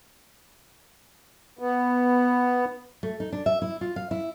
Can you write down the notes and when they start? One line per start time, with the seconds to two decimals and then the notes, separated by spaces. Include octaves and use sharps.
1.59 B3
3.03 A3
3.20 D#4
3.33 D4
3.46 E5
3.62 E4
3.81 F4
3.96 F5
4.11 E4